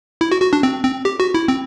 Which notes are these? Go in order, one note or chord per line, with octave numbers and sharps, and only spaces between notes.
E4
F#4
F#4
D4
C4
C4
G4
F#4
E4
C4